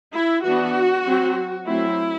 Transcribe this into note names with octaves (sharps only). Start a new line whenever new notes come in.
E4
E3 B3 D4 F#4
F#3 C4
F#3 A3 C4 E4